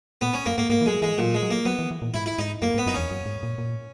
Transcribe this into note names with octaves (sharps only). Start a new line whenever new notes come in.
A#2 B3
C#4
F#2 A#3
G#2 A#3
G#2 A#3
E3
F#3 G#3
E3 G#3
A#2 F#3
G#3
F#3
A#3
F#3 B3
E3
E3
A#2
G#2 E4
E4
G#2 D#4
F#2 A#3
G#2
B3
F#2 D#4
E2 C#4
F#2
G#2
A#2
A#2